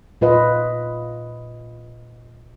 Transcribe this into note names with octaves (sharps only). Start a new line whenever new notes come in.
A#2 F4 B4 D#5